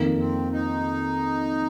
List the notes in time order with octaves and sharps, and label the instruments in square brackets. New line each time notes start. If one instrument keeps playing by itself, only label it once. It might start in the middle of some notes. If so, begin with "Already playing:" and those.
Already playing: [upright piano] F2 D#3 A#3
[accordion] C4
D#4